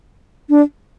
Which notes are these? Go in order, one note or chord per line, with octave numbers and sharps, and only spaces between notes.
D4